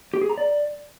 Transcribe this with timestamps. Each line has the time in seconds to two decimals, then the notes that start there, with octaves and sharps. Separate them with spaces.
0.14 G4
0.22 G#4
0.30 A#5
0.38 D5